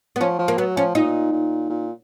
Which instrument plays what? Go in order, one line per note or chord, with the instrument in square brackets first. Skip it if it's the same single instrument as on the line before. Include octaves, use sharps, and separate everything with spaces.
[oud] B3
[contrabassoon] F3 [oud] C#4
[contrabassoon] F3
[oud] A#3
[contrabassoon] F#3 [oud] B3
[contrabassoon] F3 [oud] C#4
[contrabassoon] A#2 [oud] D#4
[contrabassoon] A#2
A#2